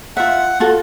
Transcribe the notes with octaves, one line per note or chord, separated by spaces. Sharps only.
F4 E5 F#5
F4 F#4 A4